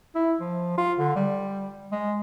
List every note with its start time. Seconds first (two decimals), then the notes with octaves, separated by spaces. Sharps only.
0.15 E4
0.40 F3
0.78 F4
0.99 D3
1.16 G3
1.92 G#3